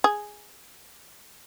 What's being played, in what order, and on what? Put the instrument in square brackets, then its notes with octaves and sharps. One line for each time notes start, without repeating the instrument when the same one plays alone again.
[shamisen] G#4